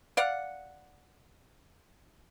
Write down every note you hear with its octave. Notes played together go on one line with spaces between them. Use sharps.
D5 F5 F#5